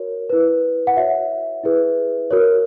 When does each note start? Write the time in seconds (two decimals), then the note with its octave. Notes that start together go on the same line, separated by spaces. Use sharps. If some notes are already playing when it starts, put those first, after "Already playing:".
Already playing: F#4 A#4 C#5
0.30 E4 B4
0.87 F#5
0.97 F#4 C#5 E5
1.64 E4 G#4 B4
2.31 F#4 A#4 C#5